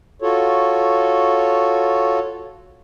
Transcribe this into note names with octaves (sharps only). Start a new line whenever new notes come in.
F4 F#4 A4 C#5